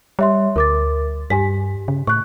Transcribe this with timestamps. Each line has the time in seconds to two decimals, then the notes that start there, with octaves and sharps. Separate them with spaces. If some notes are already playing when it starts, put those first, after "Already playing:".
0.19 G3 C#5 E5 C6
0.56 D2 A#4 D6 A6
1.30 G2 G4 G#5 B6
1.88 C#3
2.07 A2 C#6 F#6